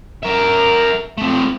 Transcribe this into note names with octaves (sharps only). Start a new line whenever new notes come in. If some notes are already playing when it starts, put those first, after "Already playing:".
A#4 E5
A3 C4